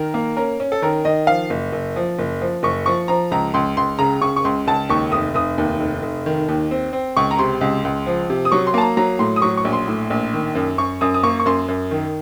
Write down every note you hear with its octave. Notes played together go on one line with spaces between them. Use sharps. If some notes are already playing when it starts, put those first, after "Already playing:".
Already playing: D#3 A#4
A#3
C#4 A#4
C#4
A4
D#3 A#4
D#3 D#5
F3 F5
F#1
F#1
F3
F#1
F3
F#1 C#6
F3 C#6
F3 A#5
C#2 A#5
C#2 C6
C#2 C6
C#3 A#5
C#3 C#6
C#6
C#2 C6
C#2 A5
D#2 C#6
F1 D#6
F1 D#6
D#2
F1
F1
D#3
D#2
C4
C4
C#2 C#6
A#5
C3 C6
C#2
C#2
F3
C3
D#6
F#3 C#6
C6
A#3 A5
A#5
F#3 A#5
A2 C6
D#6
F#3 C#6
C#6
A#1
C6
A2
A#1
D#3
F#2
F#2 C#6
F#2 D#6
D#6
A#3 C#6
C#6
F#2 C6
F#2
D#3